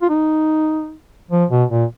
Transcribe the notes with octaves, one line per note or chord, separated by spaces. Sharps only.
F4
D#4
F3
B2
A#2